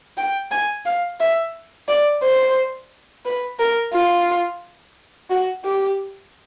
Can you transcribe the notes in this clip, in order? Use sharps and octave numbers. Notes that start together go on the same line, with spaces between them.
G5
G#5
F5
E5
D5
C5
B4
A#4
F4
F#4
G4